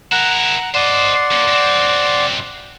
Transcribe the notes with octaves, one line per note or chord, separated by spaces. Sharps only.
E4 A#4 F#5 A#5 F#6
C5 D5 D#5 F#5 C6
A#3 C#4
F#2 C4